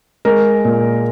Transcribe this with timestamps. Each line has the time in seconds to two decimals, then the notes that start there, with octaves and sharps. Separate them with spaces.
0.25 G#3 A#4
0.65 A#2